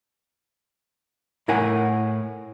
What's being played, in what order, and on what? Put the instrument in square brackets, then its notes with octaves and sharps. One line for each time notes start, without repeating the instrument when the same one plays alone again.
[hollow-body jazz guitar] A2 E4 A#4 F#5 G#5